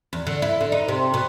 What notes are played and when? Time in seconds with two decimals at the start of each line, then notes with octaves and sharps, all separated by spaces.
0.13 E2
0.27 D3
0.42 E4
0.61 D3
0.72 D#4
0.88 C3
1.14 B2